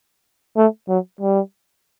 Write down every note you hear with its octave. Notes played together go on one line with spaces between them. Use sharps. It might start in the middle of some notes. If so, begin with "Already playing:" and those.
A3
F#3
G3